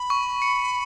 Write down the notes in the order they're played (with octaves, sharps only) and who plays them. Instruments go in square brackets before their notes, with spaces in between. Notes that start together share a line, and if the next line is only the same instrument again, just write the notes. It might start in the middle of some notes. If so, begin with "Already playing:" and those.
Already playing: [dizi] B5
[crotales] C#6
C#7